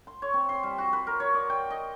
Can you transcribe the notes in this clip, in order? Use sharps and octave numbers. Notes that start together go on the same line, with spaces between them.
C6
C#5
C4
C6
G3
F#4
B4
A#4
C#5
D5
G5
D#5